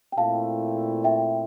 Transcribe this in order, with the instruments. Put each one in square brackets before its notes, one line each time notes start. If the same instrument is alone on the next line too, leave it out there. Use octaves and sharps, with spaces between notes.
[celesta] G5
[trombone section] A#2 A3 C4 E4 [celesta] F5 A5
[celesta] E5 G5